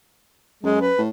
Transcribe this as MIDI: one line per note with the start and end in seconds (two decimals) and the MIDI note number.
0.63 0.90 42
0.63 0.81 56
0.82 1.01 71
0.98 1.09 45